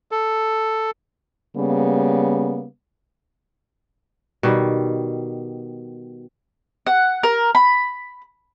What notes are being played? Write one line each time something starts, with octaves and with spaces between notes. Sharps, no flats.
A4
C#3 G3 A#3 B3
B2 D#3 G3
F#5
A#4
B5